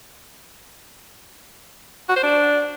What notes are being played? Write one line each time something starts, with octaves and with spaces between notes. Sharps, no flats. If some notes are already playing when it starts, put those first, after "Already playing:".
F#4
C5
D4